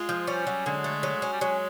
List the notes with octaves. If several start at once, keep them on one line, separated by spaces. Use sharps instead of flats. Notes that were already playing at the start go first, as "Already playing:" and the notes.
Already playing: G#3 F4
F3
G3 C#4
F#3
D3 G#3
A3
F#3
C#4
G3
F#3 G#3